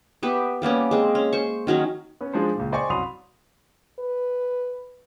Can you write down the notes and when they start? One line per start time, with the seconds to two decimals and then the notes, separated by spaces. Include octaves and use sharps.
0.23 B3 G4 E5
0.62 G3 A#3 B3 C#4
0.91 G#3 C4
1.15 C#4
1.33 C5 C#6
1.67 D#3 F#3 C#4 D#4
2.21 B3 C#4
2.34 F3 G#3 D4 C5
2.55 C#2 A#2
2.72 C5 D5 D#5 G5 G#5 C#6
2.90 C2 F#2 B5 C6 D#6 F7
3.99 B4